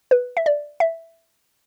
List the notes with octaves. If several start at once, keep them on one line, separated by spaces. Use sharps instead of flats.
B4
E5
D5
E5